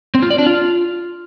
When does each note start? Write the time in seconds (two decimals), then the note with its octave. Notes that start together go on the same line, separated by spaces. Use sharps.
0.15 C4
0.23 F4
0.30 D5
0.38 D4
0.46 F4